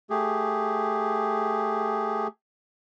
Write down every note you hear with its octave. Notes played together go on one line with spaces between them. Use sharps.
A3 G4 G#4